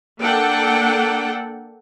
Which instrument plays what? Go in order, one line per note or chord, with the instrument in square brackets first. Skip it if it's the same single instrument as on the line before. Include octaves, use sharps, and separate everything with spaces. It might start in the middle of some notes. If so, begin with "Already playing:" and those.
[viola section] A#3 D4 A4 F#5 G5